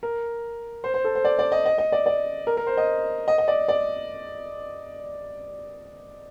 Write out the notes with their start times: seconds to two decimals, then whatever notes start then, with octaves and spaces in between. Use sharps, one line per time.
0.03 A#4
0.84 C5
0.94 C5
1.04 A4
1.15 C5
1.25 D5
1.39 D5
1.52 D#5
1.66 D#5
1.78 D#5
1.92 D5
2.06 D5
2.47 A#4
2.57 A#4
2.67 C5
2.77 D#5
3.28 D#5
3.38 D#5
3.48 D5
3.68 D5